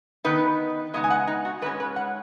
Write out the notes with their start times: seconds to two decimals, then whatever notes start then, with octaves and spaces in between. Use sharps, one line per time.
0.24 D#3 B3 D#4 B4
0.94 C#3 G#3 B3 D#4 D#5
1.04 G#5
1.10 F#5
1.27 D#4
1.45 F#4
1.62 G#2 G#3 C#4 B4
1.80 B4
1.96 F#5